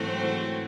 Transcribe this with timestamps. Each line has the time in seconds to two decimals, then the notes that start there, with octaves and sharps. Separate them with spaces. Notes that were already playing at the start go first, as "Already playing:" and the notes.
Already playing: G#2 E3 F#3 A3 C4 F#4
0.23 E3